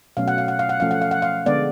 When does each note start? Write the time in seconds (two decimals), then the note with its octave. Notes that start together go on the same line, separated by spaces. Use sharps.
0.17 B2 F#3 A3 C#4 F5
0.28 F#5
0.38 F5
0.48 F#5
0.59 F5
0.69 F#5
0.80 F3 A3 C#4 F5
0.91 F#5
1.02 F5
1.11 F#5
1.22 F5
1.46 D3 G#3 B3 D5